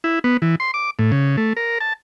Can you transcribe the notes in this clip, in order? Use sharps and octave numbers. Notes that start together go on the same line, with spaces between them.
E4
B3
E3
C6
D6
A2
C#3
A3
A#4
A5